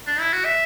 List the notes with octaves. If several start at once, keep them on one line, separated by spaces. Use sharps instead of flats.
D4
E4
F#4
E5